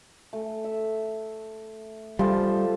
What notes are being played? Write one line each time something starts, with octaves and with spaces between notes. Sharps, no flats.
A3
E5
F3 G3 F4 A4